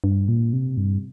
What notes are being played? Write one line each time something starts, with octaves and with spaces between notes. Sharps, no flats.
G2
A#2
C3
G2